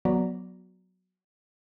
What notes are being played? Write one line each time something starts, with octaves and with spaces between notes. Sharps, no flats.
F#3 B3 F#4 D5 A#5 B5